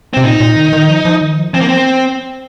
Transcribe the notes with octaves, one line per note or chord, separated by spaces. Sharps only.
C3 C4
A#2 D#4
A#2
D#3
D#3
F3
F3
D#3
F3
F3 C4
A#3
C4